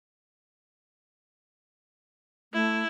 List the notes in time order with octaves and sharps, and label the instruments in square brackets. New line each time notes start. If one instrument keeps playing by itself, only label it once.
[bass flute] A3 [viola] E4